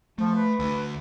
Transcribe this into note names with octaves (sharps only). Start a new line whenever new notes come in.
F3 A3
B4
D2